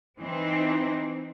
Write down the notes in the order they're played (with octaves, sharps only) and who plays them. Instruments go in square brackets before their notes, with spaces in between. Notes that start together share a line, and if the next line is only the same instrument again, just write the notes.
[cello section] E3 C4 D#4